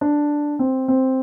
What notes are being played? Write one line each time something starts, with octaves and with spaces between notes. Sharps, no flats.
D4
C4
C4